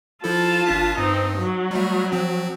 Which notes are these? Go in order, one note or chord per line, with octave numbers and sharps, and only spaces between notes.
F3 E4 F4 A4 A5
G#1 D4 B6
G2 C4 D#4
F#3
G3 A3
F3 C4